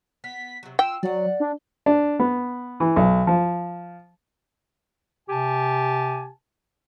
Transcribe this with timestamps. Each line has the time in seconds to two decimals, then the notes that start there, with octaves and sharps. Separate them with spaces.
0.24 B3 B6
0.63 C3 F#3
0.79 F4 G5 E6
1.03 F#3 D5 F#5
1.40 D4
1.86 D4
2.20 B3
2.80 E3
2.96 B1
3.27 F3
5.29 C3 G4 G#5 A5